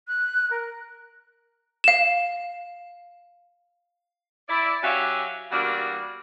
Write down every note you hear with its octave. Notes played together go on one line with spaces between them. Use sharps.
F#6
A#4
F5 E7
E4 D5
F#3 C#4 F#4 G4 E5 F5
E2 G3 A#3 D4 F#4